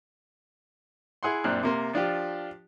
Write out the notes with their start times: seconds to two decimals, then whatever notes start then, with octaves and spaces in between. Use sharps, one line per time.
1.23 E4 G#4 F#5 C6
1.44 F#2 A#2 C4 D4 F6 F#6
1.63 C3 A#3 C6
1.93 F3 D4 F4 G4